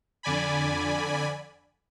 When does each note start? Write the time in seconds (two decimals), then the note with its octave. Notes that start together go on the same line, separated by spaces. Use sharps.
0.23 F2 D3 D5 G#5 B5